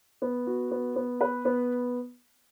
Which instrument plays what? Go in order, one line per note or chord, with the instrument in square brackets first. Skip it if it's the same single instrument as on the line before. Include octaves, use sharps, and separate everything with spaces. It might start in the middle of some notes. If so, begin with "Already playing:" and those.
[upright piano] B3
F#4
B3
B3
B4
B3